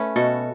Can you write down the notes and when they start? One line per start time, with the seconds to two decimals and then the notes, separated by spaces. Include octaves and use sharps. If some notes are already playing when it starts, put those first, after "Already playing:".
Already playing: A3 C#4 B4
0.16 B2 F#4 A4